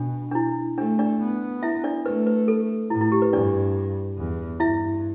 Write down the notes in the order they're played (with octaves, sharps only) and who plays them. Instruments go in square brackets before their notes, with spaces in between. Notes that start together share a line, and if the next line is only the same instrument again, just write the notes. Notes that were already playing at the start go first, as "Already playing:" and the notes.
Already playing: [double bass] B2 [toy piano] D4
[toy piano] D4
E4
[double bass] A3 [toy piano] D4
[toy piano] D4 D5
[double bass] B3
[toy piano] E4 E5
D4 D5
[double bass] A3 [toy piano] B4
[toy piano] B4
A4
[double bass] A2 [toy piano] E4
[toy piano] E4
G4
B4
[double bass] G2 [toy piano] D4 D5
[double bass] E2
[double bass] G2 [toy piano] E4 E5